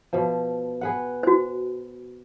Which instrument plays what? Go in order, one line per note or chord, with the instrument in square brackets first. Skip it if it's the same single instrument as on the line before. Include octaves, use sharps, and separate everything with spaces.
[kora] B2 F3
G#4 B4 F#5
[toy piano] F#4 C5